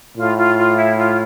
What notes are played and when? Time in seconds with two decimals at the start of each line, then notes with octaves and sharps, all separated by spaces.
0.17 A2 F4
0.37 F4
0.57 F4
0.76 E4
0.97 F4